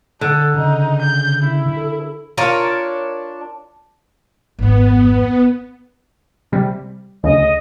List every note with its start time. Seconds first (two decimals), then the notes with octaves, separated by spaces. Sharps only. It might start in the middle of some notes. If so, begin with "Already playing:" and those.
0.21 D3 A4
0.55 C#3 D#4
1.02 G6
1.43 E4
1.76 A4
2.38 D4 F4 A#4 C#5
4.59 G#1 F2 B3
6.52 C3 G3
7.24 D2 C#3 D#5